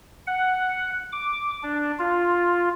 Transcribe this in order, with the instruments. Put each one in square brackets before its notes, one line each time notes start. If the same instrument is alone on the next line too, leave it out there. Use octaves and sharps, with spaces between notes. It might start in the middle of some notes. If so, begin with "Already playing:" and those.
[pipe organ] F#5
D6
D4
F4